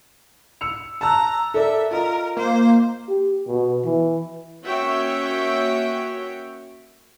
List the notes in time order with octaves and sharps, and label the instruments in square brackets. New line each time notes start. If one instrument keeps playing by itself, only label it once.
[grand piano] E6 C#7 F7
[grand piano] A5 E6 F#6 [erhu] A#5
[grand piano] A4 A#4 D5 [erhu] E5
[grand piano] F4 D#5 [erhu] A#4
[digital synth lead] A#3 [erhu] C5
[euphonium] G4
B2
E3
[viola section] A#3 C#4 F#4 C#5 E5 G5